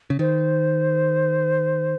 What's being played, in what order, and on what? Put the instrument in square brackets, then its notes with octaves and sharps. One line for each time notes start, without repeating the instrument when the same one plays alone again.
[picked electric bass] C#3
[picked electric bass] D#3 [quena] C5